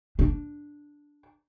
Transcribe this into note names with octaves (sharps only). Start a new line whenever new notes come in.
D4